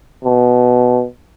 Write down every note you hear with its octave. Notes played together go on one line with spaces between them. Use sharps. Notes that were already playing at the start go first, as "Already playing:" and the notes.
B2